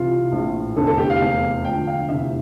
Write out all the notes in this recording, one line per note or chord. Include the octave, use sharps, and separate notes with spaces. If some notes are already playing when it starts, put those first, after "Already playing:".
Already playing: C2 C3 E3 F4
A#1 A2 E3
F1 E2 D3 A4
A4
G4
F5
F1 E2 E3
E1 D2 D3 F3 G5
F5
F1 E2 C3 E3 E5